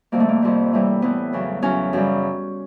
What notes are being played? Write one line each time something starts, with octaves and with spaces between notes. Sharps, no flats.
F2 C3 D#3 G3 A#3
A3
A#3
F2 C3 D#3 G3
A2 E3 G3
A2 E3 G3 B3
E2 C#3 F#3
E2 C#3 F#3 C#4
F#2 C#3 E3 G3